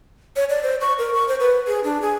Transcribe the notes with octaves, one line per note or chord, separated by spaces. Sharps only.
C#5
D5
C5
C#6
A#4
C#6
C5
B4
G#4
D4
G#4